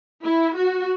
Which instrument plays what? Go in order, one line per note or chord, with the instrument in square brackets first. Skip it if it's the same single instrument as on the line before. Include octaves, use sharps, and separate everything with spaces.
[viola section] E4
F#4